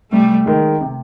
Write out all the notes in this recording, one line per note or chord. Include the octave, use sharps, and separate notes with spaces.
C3 G3 A3
D#3 G#3
C3